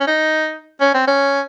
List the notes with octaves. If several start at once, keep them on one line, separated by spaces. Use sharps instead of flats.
C#4
D#4
C#4
C4
C#4